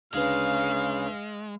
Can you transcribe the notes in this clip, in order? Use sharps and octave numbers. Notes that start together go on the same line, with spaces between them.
D2 C#3 G#3 D4 B4 F5